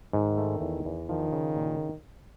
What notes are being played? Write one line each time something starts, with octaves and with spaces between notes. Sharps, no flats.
G#2 D#3
A3
E2
E2
D#3 F3
C#3
A#2